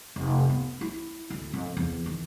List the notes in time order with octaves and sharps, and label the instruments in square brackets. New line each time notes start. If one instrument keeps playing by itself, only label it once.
[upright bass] F1
B3
E4
D2
F2
E2
D#3